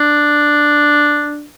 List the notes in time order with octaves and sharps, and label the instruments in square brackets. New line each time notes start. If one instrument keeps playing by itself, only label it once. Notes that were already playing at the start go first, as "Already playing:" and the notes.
Already playing: [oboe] D4